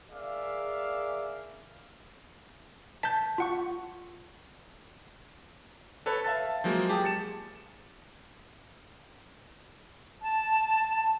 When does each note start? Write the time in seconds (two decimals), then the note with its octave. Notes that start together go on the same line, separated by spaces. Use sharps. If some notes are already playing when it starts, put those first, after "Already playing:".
0.10 G#4 A#4 D5 E5 F5
3.03 A5 G6 B6
3.38 F4 F#5 C#6
6.06 A4 B4 C#5 A5
6.25 E5 F5 A5 A6
6.64 F3 F#3 G#3 A#3
6.89 G4 G#4 A5
7.04 A6 C#7 E7
10.22 A5